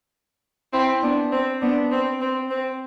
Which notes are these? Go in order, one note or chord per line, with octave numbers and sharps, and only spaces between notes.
C4 E4
B3 D4
C4
B3 D4
C4
C4
C4